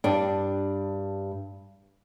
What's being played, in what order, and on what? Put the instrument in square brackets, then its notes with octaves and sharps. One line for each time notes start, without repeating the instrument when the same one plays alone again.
[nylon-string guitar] G2 D4